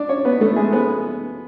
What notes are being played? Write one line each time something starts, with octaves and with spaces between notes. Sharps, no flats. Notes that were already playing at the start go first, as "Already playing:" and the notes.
Already playing: D4 D5
C#4 C#5
B3 B4
A3 A4
G#3 G#4
B3 B4